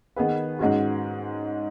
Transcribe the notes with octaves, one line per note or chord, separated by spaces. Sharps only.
D#3 B3 D#4 G#4 B4
G#2 G#3 C#4 F#4